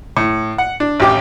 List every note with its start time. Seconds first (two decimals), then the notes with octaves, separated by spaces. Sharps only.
0.17 A2
0.58 F#5
0.80 D4
1.00 A1 D#2 G4 G5 D6